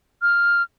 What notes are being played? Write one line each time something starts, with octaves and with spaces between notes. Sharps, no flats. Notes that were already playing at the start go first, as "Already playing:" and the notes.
F6